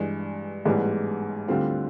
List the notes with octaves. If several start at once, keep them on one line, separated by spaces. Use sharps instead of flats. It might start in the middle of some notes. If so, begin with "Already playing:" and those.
Already playing: G2 E3 G#3
A1 G#2 E3 G3 B3
D2 D3 G3 C4 F4